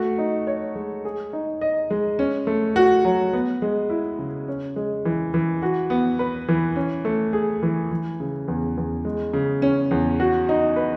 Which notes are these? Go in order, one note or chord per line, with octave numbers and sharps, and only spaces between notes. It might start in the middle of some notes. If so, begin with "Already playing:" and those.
Already playing: A3 F#4
D#4
C#5
G#3
G#4
D#4
D#5
G#3
C#4
A3
F#4
F#3
B3
G#3
E4
C#3
C#4
G#3
E3
E3
F#4
B3
B4
E3
C#4
A3
G#4
E3
E3
C#3
E2
E2
G#3
C#3
C#4
E2
F#4
D#4
B4